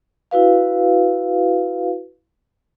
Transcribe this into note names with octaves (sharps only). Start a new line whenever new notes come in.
E4 F#4 B4 F5